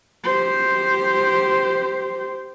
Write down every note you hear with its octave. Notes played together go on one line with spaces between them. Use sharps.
G4 C5